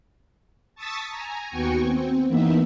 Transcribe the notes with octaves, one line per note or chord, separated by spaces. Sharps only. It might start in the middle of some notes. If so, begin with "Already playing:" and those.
A5 C#6 D#6 E6 A6 B6
G#5 A#5
D#2 B3 F#4 G5 G#5 C#6
C4
E3 A#3 B3 D#4 E5